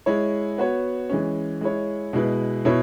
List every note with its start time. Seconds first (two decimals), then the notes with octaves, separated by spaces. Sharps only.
0.06 G#3 E4 C#5
0.58 B3 F#4 C#5
1.09 E3 G#3 C#4
1.61 G#3 E4 C#5
2.13 B2 G#3 E4 B4
2.65 B2 B3 E4 C#5